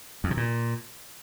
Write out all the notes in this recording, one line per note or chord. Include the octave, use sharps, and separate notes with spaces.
F2
C3
A#2